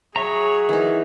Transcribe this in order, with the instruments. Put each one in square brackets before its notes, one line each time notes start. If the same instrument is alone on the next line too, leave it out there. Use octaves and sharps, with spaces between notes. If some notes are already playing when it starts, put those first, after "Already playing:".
[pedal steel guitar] F#3 E5 A#5 [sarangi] G#4 [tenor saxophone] C#5
[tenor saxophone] D#3 [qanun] E3 D#4